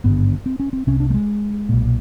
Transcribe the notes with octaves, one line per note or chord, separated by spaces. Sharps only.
G#1 G2 D3 B3
C4
C#4
C4
C2 C3 C#4
D4
A3
G#3
B1 A#2